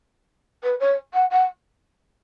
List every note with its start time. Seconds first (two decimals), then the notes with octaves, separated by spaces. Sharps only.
0.63 B4
0.80 C#5
1.13 F#5
1.31 F#5